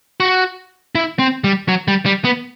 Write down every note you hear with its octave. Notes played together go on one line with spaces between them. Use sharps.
F#4
E4
C4
G3
F#3
G3
G3
B3